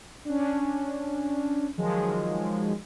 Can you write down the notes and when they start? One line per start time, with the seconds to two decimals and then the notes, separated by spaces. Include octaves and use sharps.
0.25 C#4 D4
1.77 D#3 F3 F#3 G#3